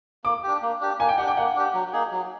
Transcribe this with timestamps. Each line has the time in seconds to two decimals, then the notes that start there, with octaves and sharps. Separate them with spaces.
0.24 A#3 D6
0.43 D4 G4
0.62 A#3
0.80 D4 G4
0.99 A#3 G#5
1.09 G5
1.18 D4 G4 F#5
1.28 G5
1.37 A#3 F#5
1.56 D4 G4
1.74 F#3
1.93 A#3 D#4 G#4
2.12 F#3